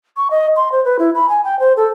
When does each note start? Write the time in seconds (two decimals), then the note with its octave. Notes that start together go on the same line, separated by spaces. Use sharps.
0.17 C#6
0.31 D#5
0.56 C6
0.72 C5
0.85 B4
0.99 E4
1.15 B5
1.29 G#5
1.44 G5
1.60 C5
1.77 A4